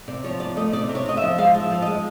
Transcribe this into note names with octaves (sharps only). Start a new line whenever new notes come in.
C3 D5
F3 C#5
C3 D5
A3 D#5
C3 D5
C3
C#5
C3 D#5
E5
F3
G#3 F5
F3
E5
F3
D#5
G#3